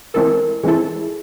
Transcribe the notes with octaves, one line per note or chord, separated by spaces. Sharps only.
E3 G#3 C4 E4 A4 A#4
E3 G#3 C4 E4 G#4 A4